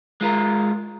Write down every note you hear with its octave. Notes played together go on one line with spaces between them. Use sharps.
G#3 F4 A#4